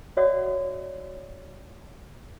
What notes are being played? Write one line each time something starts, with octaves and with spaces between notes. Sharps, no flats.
F#4 C#5 D5 E5 F#5 D#6